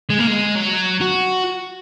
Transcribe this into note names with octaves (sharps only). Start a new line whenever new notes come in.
G#3
A#3
G#3
F#3
F#4